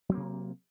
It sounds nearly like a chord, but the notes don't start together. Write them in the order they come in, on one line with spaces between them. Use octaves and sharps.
F#3 C4 A#3 C3